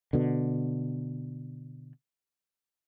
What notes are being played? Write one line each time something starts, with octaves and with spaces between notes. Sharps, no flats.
B2 D3